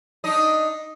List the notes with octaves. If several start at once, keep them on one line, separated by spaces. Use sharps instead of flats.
D4 D#4 D#5